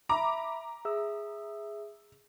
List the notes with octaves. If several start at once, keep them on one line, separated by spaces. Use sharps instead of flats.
E5 A#5 B5 D6
G#4 E5 E6